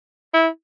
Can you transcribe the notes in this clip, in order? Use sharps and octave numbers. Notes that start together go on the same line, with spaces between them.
E4